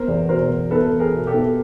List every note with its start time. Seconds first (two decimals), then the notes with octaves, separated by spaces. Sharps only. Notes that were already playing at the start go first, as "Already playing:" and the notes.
Already playing: B3 A#4 C5
0.08 E2
0.29 B2 A#4 C5
0.50 E2
0.71 B3 A4 B4
0.92 E2
1.00 G#4 A#4
1.13 B2
1.27 G4 A4
1.34 B3